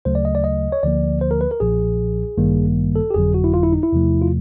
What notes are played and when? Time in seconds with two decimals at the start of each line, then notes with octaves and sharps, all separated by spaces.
0.05 D2 C#3 F#3 A3 C5
0.15 D5
0.25 D#5
0.35 D5
0.44 D#5
0.72 C#5
0.83 D2 D3 F3 A#3 D5
1.21 C5
1.31 A#4
1.41 B4
1.51 A#4
1.60 B1 A#2 F3 G#4
2.38 A1 G2 D#3 G3 A#3
2.96 A4
3.11 G4
3.14 G1 F2 D3 F#3 G#4
3.34 F#4
3.44 E4
3.54 F4
3.63 E4
3.72 D#4
3.83 E4
3.93 E2 C3 F3 A3
4.22 F4